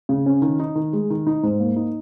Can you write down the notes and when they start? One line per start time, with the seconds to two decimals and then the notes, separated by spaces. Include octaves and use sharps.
0.09 C#3
0.26 C#4
0.42 D#3
0.59 D#4
0.75 D#3
0.93 G#3
1.10 D#3
1.27 D#4
1.43 G#2
1.60 A#3
1.76 D#4